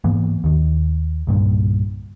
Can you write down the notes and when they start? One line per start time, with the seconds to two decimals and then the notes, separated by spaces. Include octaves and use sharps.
0.04 G#2 E3 A#3 B3
0.44 D#2 D#3
1.27 C2 G2 A#2 D3